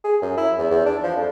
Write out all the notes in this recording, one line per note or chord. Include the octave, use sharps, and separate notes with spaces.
G#4
F#2
E4
E2
E2
D4
F3
F2